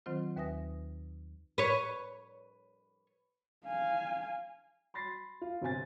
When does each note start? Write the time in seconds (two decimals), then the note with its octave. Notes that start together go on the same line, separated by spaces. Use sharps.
0.06 D#3 F#3 C4 F4 C5
0.36 D#2 B4 E5 G#5 D#6 A#6
1.58 B4 C#5
3.65 F5 G#5
4.94 B5 C6 A6 A#6 C7
5.41 F4
5.62 G1 C3 C4 G#5 A6